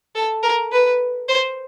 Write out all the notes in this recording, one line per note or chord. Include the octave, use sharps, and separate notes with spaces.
A4
A#4
B4
C5